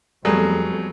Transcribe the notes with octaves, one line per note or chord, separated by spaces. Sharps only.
F2 F#3 G3 A3 B3 G#4